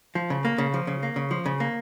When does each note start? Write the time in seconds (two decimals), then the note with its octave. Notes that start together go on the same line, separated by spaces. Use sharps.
0.15 F3
0.30 C#3
0.45 A#3
0.58 C#3
0.74 F3
0.87 C#3
1.03 A#3
1.16 C#3
1.31 F3
1.46 C#3
1.60 A#3